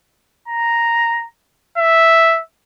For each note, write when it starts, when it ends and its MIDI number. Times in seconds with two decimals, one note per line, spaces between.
0.48 1.26 82
1.78 2.40 76